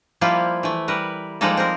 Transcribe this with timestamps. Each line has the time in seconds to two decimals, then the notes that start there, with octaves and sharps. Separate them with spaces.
0.21 F3 G3 A#3 E4 F4
0.63 E3 A3
0.88 G3 A#4 B4
1.41 F3 G3 G#3 A#3 D#4 A4
1.57 C4 A#4